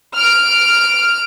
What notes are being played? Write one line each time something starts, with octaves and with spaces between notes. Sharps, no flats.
F6 D7